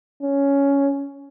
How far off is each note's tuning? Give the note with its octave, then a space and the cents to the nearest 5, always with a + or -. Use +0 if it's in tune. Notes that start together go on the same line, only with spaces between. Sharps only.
C#4 +10